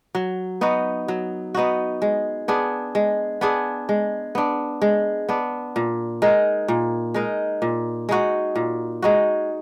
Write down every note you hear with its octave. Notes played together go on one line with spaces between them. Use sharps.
F#3
B3 D#4 F#4
F#3
B3 D#4 F#4
G#3
B3 D4 G#4
G#3
B3 D4 G#4
G#3
B3 D4
G#3
B3 D4
A#2
G#3 D#4 A#4
A#2
G#3 D#4 A#4
A#2
G#3 D#4 F#4
A#2
G#3 D#4 F#4